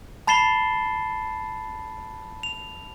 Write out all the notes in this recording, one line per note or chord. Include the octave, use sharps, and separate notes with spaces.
A5 B5 A6 C7 E7 G7
F7